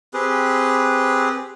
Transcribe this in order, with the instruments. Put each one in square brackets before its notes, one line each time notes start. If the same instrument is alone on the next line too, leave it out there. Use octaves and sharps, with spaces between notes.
[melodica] C4 G4 G#4 B4